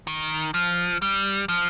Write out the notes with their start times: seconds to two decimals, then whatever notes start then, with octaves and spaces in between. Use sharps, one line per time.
0.07 D#3
0.54 F3
1.02 G3
1.49 F3